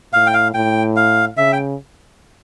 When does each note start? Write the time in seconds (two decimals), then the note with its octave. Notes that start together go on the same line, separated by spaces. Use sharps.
0.13 A2 F5
0.27 G5
0.34 F5
0.54 A2 G5
0.96 F5
1.37 C#3 E5
1.53 G5